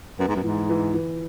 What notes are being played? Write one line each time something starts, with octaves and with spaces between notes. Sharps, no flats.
F#2 B3
G#2
F#2
G#2 E3
E3
E3